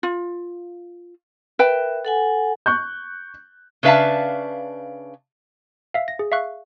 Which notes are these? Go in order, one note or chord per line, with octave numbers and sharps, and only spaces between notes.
F4
A#4 B4 E5 G5
A4 F#5 G#5
C#6 F#6 G6
C#3 D4 B4 E5 F5 A5
E5 F5
A#6
G#4
E5 F5 C#6 F#6